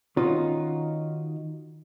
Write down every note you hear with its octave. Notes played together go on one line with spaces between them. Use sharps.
D#3 C#4 D#4 F4 F#4